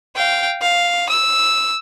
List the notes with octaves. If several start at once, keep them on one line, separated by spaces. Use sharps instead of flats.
F5 G5
F5
E6